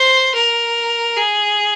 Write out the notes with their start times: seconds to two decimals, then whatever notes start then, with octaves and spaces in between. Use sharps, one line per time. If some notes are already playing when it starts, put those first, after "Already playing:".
Already playing: C5
0.35 A#4
1.17 G#4